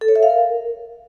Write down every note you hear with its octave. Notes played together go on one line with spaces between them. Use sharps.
A4
C#5
E5
F5
A#4